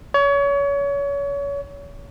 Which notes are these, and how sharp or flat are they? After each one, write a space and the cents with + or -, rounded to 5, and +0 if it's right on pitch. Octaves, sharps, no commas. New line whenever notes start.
C#5 +30